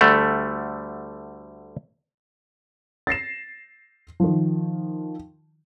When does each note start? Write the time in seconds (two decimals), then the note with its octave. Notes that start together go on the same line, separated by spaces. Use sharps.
0.01 D2 D3 G3 A3
3.07 A6 A#6 C7 E7
4.20 D#3 F3